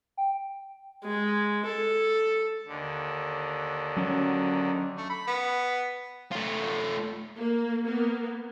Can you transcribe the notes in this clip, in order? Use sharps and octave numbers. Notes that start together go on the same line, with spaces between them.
G5
G#3
A4
D#2 D3
F#3 C#4
A3
B5
B3
A3 F4
A#3
A#3 B3